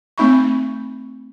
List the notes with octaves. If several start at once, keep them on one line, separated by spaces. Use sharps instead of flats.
A3 C4 D#4 E5 B5 C#6